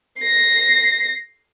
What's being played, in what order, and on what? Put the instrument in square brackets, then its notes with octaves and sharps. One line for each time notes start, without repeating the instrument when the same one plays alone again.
[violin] A#6 C7